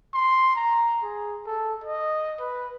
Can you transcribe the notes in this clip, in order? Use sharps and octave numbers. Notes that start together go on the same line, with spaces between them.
C6
A#5
G#4
A4
D#5
B4